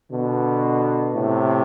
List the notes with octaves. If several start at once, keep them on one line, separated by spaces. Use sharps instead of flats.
B2 D3
A2 C3